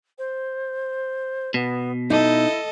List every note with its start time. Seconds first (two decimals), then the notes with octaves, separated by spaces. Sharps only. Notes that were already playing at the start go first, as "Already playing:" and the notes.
0.18 C5
1.54 B2 B3
2.10 D#4 E4 A4 D#5